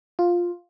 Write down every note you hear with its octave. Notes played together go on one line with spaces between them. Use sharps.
F4